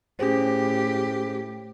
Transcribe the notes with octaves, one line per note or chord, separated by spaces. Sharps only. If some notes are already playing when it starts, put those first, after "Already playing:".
A2 C#4 G4 G#4 C5